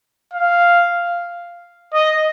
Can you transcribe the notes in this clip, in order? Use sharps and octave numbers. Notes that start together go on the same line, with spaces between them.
F5
D#5